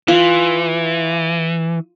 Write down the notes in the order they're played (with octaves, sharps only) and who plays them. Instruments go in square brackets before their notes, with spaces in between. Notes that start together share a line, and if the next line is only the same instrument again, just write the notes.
[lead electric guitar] E3 [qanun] F4